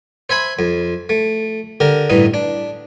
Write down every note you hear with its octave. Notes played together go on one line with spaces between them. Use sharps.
C5 E5 G#5 B5 C6
F2
A3
D3 G4 A#4
A1 G2 E3 D#4
D4